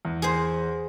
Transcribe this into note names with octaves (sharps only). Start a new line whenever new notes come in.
E2
G#4 C5